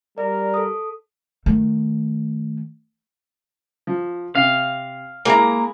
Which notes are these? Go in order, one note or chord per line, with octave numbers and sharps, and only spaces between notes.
G3 A#4 D5
A4 D#6
D#3 A3
F3
C3 F5
G#3 A#3 E4 A#5